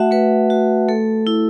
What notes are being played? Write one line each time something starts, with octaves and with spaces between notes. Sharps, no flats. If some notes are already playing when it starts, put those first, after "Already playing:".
Already playing: A3 F#4 E5 F#5 A5
A3 B4
F#4
A3 A4
E4